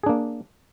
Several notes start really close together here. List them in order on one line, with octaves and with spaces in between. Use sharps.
G#4 D4 A#3